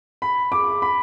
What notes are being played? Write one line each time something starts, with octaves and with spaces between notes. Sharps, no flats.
B5
D6
B5